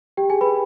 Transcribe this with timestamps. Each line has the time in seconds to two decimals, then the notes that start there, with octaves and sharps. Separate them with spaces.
0.17 G4 G5
0.30 G#4 G#5
0.41 B4 B5